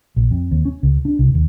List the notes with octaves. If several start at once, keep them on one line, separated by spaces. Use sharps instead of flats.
A#1
F2
D#2
C#4
C#2
D4
C2
D#2